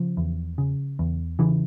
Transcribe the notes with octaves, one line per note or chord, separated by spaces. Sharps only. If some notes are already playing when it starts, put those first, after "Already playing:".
Already playing: C#3 F3
E2
C#3
E2
C#3 E3